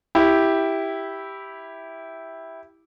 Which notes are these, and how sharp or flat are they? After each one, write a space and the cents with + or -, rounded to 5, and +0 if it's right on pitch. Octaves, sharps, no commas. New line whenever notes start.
E4 -5 G4 +0